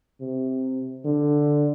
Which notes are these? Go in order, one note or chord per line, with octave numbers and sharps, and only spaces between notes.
C3
D3